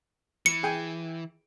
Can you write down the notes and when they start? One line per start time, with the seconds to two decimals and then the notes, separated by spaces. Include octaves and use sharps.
0.46 E3 C#7
0.63 G#4 G5 G#5